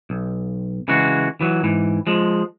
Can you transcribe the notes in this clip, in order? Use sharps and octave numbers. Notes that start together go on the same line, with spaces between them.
B1
C#3 E3 G#3 F#4
E3 F#3
G#2 E3
F3 G#3